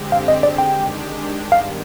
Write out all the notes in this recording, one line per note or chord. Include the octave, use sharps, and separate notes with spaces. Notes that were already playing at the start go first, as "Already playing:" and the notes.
Already playing: D3 G#3 C4 G4
F5
D#5
D5
D#3 G#3 D4 G4 G5
G2 D#3 G3 B3 F5